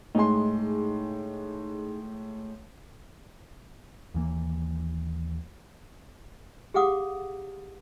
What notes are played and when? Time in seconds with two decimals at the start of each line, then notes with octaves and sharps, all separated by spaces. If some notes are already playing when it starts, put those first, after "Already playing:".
0.15 A2 G#3 D#4 G#4 C6
4.14 D#2 E3 A#3
6.74 G4 G#4 F5 F#5 D6 D#6